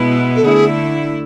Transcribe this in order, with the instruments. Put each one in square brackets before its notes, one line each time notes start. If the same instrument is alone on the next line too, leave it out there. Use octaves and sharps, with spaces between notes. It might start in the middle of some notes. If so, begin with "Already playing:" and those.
Already playing: [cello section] B2 G#3 B3 E4
[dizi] A4
[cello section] D3 A3 E4 [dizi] G#4